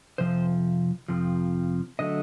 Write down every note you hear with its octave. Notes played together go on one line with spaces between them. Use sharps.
F2 C3 F3 C5
F2 C3 F3
D3 F#3 A3 D#5